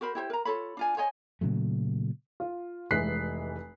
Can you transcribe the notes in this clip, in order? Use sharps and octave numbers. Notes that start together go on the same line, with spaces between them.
F#4 A#4 C5 B5
E4 G4 C5
A#4 A#5
F4 A4 C#5 B5
D4 F4 G#5
C5 C#5 D#5 G#5
A#2 C#3 F#3 A3
F4
F1 E3 G#3 F#6 B6 C7